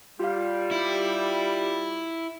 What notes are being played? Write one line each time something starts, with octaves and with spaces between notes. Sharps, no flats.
G3 F4 F5
E4